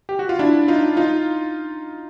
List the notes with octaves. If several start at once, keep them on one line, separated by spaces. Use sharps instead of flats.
G4
F#4
F4
D4 E4
D#4 F4
D#4 F4